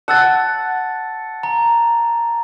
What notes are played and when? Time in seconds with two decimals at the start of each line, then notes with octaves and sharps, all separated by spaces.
0.08 F#5 A5 E6 A6
1.43 A#5